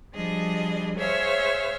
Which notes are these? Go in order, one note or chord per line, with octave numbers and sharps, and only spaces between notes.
F3 G3 D4 G#4 D#5
G#4 C5 C#5 E5 F5